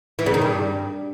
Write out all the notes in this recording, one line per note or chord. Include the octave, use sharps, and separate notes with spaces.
E3
C#3
D#3
G2